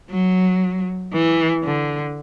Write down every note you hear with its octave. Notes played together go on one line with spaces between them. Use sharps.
F#3
E3
D3